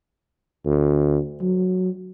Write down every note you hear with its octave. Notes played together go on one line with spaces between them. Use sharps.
D2
F#3